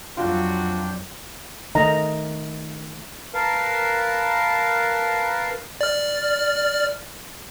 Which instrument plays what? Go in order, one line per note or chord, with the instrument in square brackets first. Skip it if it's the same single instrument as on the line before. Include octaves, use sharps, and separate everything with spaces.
[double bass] F2 F#3 [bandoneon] D4 G5 [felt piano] F4 [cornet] F#4
[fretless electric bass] D#3 A3 [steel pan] D#5 A#5
[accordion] A#4 B4 F5 A5
[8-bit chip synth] D5 F6